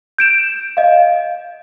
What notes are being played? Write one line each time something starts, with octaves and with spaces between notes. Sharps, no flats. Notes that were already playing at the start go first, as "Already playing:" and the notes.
G6 D7 E7
D#5 F5